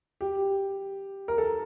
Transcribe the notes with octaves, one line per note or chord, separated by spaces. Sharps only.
G4
A#4
A4